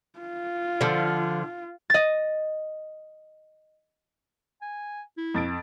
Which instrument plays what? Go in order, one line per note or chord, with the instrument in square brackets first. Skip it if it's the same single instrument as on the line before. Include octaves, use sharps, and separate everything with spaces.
[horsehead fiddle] F4
[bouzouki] D3 F3
[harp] D#5 A6
[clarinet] G#5
E4
[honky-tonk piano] F2 A6 D7